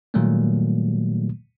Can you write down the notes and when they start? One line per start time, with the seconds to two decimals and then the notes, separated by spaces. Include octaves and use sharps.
0.14 A#2 D#3 F#3 G3 A3 A#3